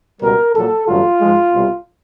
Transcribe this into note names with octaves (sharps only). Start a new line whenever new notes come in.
C#2 B2 G3 A#4
A#1 A#2 F#3 A4
A1 G2 D3 F#3 A3 F4
G#2 F3 G#3
C2 B2 G3